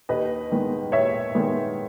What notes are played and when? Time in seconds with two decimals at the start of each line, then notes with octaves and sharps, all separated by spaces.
0.09 D#2 B4 D#5
0.52 D#3 G#3 B3
0.92 D#2 C#5 E5
1.35 D#3 G#3 B3